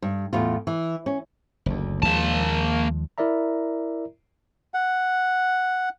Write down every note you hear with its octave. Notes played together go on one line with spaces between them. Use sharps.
G2
E2 A2 F4
E3
C#4
F#1 D2
D#2 F3 G#3 A#3 A5
E4 A#4 D5 E5 A#5
F#5